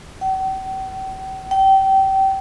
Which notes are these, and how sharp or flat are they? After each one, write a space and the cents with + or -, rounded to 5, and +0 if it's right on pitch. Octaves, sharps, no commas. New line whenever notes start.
G5 -45
G5 -25